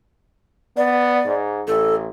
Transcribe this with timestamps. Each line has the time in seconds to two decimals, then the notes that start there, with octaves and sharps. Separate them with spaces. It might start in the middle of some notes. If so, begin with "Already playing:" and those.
0.77 B3 D5
1.26 G#2
1.68 A1 A4